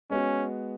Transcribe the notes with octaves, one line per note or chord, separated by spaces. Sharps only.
G#3 B3 C#4 F#4